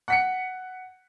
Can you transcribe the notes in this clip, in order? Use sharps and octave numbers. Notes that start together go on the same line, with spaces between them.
F#5 B6 C#7